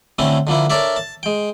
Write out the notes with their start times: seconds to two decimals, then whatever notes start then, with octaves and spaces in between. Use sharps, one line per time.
0.19 D3 A3 C4 C#4 E4
0.47 D3 F3 A#3 E4
0.70 D4 A4 A#4 C#5 D5 E5
0.96 A5
1.23 G#3 G5